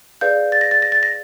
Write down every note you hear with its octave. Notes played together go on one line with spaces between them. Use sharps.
G#4 B4 D5 F5 G6
A6
A#6
A6
A#6
A6
A#6